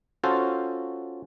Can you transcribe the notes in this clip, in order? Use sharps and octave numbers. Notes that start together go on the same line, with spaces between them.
C#4 F4 F#4 A4 C5